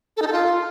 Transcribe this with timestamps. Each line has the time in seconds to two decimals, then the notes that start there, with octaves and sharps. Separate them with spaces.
0.17 A4
0.22 D#4
0.27 A4
0.32 F4